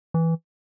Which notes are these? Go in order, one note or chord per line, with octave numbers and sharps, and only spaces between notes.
E3